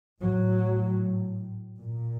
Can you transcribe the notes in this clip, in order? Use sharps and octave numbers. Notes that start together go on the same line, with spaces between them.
A2 F#3
A#2